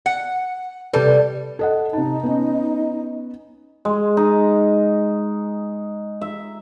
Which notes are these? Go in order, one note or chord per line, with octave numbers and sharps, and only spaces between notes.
F#5
C3 G3 A4 B4
A4 D#5 F#5
C3 D#4 D#5 A5
B3 C#4
G#3
D#4
E5